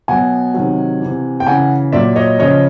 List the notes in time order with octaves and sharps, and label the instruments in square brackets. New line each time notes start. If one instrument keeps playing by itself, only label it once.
[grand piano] B2 F#3 F#5 G#5
C3 D#3 F#3
C3 E3
G5
C#3 E3 F#5 G#5
A#2 F#3 D5 E5
C#5 D#5
C#3 F3 C#5 D#5